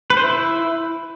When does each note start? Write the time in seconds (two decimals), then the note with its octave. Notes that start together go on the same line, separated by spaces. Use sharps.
0.10 B4
0.17 C5
0.24 E4